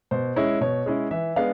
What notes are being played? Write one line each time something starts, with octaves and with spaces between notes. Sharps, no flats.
B2 C5
G#3 C#4 E4 C#5
B2 C#5
G#3 C#4 E4
E3 E5
G#3 B3 D4 F5